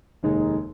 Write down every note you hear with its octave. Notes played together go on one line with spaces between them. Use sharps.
F1 D#2 D#3 G#3 D#4